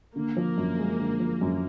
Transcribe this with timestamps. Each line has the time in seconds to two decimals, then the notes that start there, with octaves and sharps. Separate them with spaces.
0.16 D3 A#3
0.37 F3
0.57 F#2
0.79 G#3
1.00 D3
1.20 F3
1.41 F#2